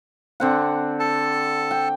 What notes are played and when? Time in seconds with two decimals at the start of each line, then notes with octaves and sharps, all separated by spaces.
0.40 D3 C4 F#5
1.00 A4 A5
1.71 G5